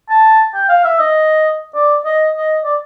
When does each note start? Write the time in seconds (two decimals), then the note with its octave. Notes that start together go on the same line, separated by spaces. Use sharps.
0.10 A5
0.54 G5
0.69 F5
0.85 E5
0.99 D#5
1.75 D5
2.05 D#5
2.35 D#5
2.64 D5